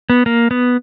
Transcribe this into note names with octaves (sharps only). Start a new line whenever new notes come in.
B3
A#3
B3